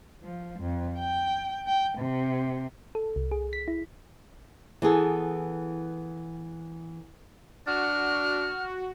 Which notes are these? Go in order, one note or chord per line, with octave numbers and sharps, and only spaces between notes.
F3
F2
G5
G5
C3
A4
C2
G#4
B6
E4
E3 B3 G#4 A4
D4 F#4 F6